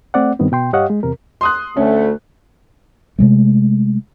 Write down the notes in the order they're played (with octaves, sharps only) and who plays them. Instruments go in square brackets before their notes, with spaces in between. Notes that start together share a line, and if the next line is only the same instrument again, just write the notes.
[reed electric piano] A3 C4 D5 F#5
G2 D#3 B3 C4
B2 G5 C6
G2 G4 C#5 D#5 F5 F#5
G#3
E2 C3 A#4
[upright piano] C6 D#6 F#6
[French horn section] D2 A3 [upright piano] C#4
[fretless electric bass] C3 G#3 A3